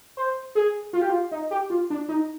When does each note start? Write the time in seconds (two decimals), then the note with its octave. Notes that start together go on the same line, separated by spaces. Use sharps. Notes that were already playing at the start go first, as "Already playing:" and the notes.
0.17 C5
0.55 G#4
0.93 F4
1.02 G4
1.10 F4
1.31 D#4
1.51 G4
1.70 F4
1.90 D4
2.09 D#4